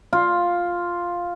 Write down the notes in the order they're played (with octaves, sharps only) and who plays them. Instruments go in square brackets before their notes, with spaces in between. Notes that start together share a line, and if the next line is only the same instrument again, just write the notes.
[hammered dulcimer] F4